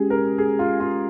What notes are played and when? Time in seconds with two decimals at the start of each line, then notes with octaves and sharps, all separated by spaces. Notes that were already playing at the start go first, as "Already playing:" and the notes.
Already playing: G#3 C#4 G4 G#4
0.10 A#4
0.38 G#4
0.59 F4
0.80 F4